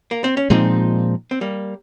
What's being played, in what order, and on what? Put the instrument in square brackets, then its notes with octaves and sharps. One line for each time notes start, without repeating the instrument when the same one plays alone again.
[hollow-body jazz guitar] A#3
C4
C#4
[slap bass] A#2 F3 G#3 [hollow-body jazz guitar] C4 D#4
[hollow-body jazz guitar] C4
G3 A#3